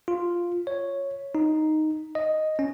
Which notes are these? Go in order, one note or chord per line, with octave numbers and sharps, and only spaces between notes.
F4
C#5
D#4
D#5
C#4